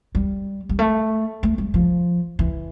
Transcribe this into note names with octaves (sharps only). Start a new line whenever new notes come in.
G3
G3
A3
A3
G3
F3
E3